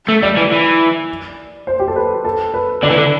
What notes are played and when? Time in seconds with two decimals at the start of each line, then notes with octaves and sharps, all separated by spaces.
0.08 A3
0.22 G3 D5
0.37 E3
0.52 E3
1.67 C5
1.79 G4
1.88 A4
1.96 B4
2.25 A4
2.54 B4
2.83 D3 D5
2.90 E3
2.97 D3